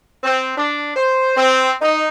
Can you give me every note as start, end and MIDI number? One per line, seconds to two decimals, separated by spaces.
0.23 0.54 60
0.56 0.92 62
0.95 1.32 72
1.35 1.72 60
1.80 2.08 63